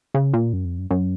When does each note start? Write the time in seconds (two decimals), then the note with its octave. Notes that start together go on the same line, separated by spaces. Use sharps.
0.14 C#3
0.33 A#2
0.53 F#2
0.65 F2
0.78 F#2
0.91 F#2